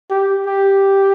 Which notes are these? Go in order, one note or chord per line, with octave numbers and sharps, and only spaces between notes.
G4
G4